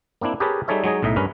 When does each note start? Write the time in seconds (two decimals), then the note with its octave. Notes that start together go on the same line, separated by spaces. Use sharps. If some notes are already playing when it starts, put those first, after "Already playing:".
0.21 A#3 C4 D4 E4
0.40 G4 G#4 A#4 B4 C#5 A5
0.68 G3 D#4 G#4 A4 C#5 E5
0.84 F#3 G#3 D#4 G#4 C#5 D#5
1.03 B1 A2 D#4 D#5 E5
1.16 G2 C#4 A#4 B4